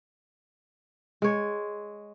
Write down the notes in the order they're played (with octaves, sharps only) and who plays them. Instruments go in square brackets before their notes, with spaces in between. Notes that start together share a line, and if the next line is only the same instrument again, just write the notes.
[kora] G#3 C#5